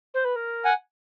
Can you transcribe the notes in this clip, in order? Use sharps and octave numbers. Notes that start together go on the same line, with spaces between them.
C5
B4
A#4
F#5 G#5